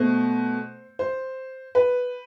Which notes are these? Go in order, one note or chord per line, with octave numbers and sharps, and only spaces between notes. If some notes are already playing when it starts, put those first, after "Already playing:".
Already playing: B2 A3 C5
C5
B4